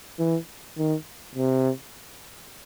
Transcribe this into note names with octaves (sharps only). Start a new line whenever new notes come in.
E3
D#3
C3